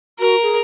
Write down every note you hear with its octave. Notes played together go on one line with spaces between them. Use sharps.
F#4 A#4
G#4